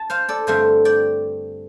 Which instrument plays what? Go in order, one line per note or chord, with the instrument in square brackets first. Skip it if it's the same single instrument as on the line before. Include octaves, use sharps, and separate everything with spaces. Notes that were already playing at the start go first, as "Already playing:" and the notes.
Already playing: [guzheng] A5
C5 F5
A4 D5
G2 D3 A3 C4 C5 F5
D5 G5